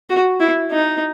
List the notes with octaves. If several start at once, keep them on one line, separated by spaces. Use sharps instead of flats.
F#4
E4
D#4